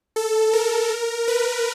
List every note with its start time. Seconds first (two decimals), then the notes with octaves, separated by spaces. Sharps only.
0.16 A4
0.53 A#4
1.28 B4